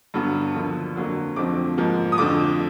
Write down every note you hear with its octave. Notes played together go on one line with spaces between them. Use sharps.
G2 D3 F#3 B3
D#2 D3 F3
F2 D3 F#3 A#3
F2 D3 F3 A3 C4 D6
G#2 F3 A#3
D#6
F2 D3 F3 A3 D6